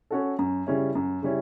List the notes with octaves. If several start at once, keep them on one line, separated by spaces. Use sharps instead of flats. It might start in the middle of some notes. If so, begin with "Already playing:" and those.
C#4 F#4 A4
F#2
C#3 G3 C#4 E4
F#2
C#3 G3 C#4 E4